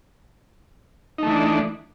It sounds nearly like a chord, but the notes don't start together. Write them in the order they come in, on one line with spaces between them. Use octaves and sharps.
D#4 A3 E3 D4